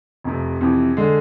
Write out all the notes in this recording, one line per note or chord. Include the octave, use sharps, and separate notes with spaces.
F1 F2 C3
F2 C3 E3
D3 G#3